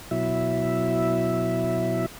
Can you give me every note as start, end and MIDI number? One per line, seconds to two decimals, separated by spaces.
0.11 2.06 47
0.11 2.06 54
0.11 2.06 64
0.11 2.06 76